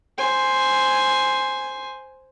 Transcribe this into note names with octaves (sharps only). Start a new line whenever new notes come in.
C5 G#5